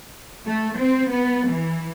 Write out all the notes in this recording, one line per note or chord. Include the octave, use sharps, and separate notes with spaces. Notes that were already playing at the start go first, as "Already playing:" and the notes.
A3
C4
B3
E3